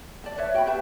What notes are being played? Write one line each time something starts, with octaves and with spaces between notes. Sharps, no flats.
D5 A5
B4 C#5 E5
F#4 G5 G#5 B5
G4 B4 E5 A5